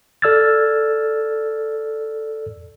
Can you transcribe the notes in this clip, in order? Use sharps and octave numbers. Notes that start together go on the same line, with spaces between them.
A4 D5 E6 F6 G#6 A6